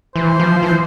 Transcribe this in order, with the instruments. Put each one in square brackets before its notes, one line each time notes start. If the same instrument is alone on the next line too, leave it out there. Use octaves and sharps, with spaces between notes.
[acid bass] E3 [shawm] C5
[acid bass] F3
E3